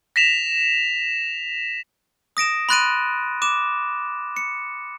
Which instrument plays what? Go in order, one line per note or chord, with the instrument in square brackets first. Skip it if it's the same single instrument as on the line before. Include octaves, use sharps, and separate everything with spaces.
[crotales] A#6 B6 E7 F7
[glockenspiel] D#6 A#6 D7 E7
B5 C6 F#6 A6 D7 D#7
D6 E7
C#7